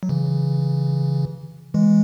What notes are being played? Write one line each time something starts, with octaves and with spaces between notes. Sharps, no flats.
F#3
C#3 E3
E3 G#3